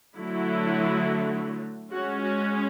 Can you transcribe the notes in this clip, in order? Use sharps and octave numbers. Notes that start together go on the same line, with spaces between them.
D3 F#3 A3 E4
G#3 C#4 F#4
F#4